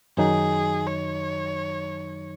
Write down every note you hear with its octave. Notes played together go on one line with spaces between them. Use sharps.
F#2 D#3 F#3 D#4 G#4
C#5